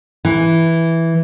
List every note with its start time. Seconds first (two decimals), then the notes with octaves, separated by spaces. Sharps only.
0.25 E3